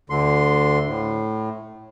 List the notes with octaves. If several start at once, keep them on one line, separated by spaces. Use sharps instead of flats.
D2 D3 C6
A2